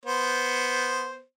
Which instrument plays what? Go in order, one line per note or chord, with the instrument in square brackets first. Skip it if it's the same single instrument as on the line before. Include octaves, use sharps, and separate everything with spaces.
[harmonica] B3 C5